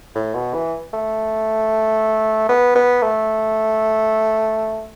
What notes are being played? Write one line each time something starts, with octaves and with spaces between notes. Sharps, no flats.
A2
B2
E3
A3
B3
B3
A3